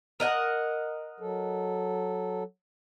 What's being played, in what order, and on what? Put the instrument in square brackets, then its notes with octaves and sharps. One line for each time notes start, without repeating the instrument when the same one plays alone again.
[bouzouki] A#4 D#5 F#5
[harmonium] F#3 A4